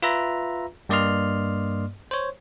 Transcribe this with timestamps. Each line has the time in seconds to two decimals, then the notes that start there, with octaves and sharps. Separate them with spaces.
0.02 F4 B4 E5 A#5
0.89 G2 A#3 D5 D#5 C6 F6
2.11 C5 C#5